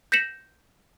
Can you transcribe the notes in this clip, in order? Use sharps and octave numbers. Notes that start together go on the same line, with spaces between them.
G6 A#6 B6 C#7 E7 F#7